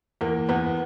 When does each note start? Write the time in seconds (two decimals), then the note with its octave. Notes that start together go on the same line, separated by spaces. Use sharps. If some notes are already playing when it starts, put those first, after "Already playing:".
0.21 E2 A#3
0.49 E2 B3